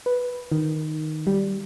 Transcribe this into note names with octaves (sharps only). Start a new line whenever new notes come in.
B4
D#3
G3